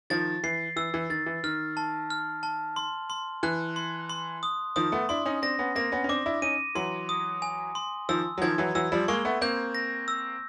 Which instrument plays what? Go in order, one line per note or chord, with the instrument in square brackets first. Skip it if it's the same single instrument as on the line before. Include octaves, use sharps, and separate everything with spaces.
[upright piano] D#3 F3 [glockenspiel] A6
[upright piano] E3 [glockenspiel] C7
[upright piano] E3 [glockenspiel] E6
[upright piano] E3
[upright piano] D#3 [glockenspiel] A6
[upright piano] E3
[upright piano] D#3 [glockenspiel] F6
[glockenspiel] A5
F6
A5
C6
C6
[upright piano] E3 [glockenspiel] F#6
[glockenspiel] C6
C6
D#6
[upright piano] D#3 F3 [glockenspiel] D#6
[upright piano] A3 B3
[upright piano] D4 E4 [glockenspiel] C6
[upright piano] C#4 D#4
[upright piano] C4 D4 [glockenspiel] A#6
[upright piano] B3 C#4
[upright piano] A#3 C4 [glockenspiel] A#6
[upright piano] B3 C#4
C#4
[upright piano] C4 D4 [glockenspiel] D6
[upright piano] D4 E4
[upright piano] C#4 D#4 [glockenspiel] D#7
[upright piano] E3 F#3 [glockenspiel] C6
[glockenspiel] D#6
G#5
C6
[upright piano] D#3 F3 [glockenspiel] E6
[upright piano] F#3
[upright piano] D#3 F3 [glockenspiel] G#6
[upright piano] E3 F#3
[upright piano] E3 F#3 [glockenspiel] E6
[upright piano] F3 G3
[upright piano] G#3 A#3 [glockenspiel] C#6
[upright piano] A3 B3
[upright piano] A#3 C4 [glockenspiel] G6
[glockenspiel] A#6
E6